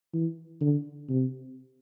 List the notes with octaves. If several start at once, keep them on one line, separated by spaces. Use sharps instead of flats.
E3
D3
C3